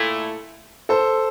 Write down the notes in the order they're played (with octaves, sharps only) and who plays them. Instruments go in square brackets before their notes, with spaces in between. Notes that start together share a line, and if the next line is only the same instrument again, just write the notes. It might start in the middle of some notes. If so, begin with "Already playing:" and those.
Already playing: [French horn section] A#2 A3 E4 [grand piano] A4
[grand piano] A4 C5